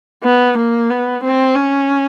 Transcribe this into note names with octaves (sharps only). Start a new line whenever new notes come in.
B3
A#3
B3
C4
C#4